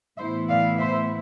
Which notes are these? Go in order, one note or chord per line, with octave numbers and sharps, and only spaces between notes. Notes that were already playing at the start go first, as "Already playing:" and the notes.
A2 E3 B3 E4 C5 E5
D5 F5
C5 E5